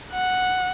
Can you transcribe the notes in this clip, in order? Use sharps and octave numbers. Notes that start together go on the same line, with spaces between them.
F#5